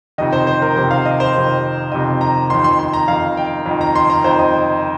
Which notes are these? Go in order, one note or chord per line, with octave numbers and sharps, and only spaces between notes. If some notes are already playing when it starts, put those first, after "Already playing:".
F2 C3 D#3 D#5
C5
C5
A#4
F2 C3 D#3 C5
F5
D#5
C5
F2 C3 D#3
F2 C3 D#3 D#5
A#5
F2 D#3 C6
C6
C6
A#5
F2 D#3 F5
G5
F2
D#3
A#5
C6
A#5
F2 D#3 C5
D#5